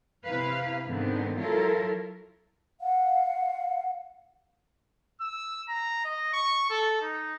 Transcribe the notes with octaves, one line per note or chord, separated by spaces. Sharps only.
C3 E4 B4 F5
G#2 D3 D#3 B3 C4
F#3 E4 F4 A4 A#4
F5 F#5
E6
A#5
D#5
C#6
A4
D#4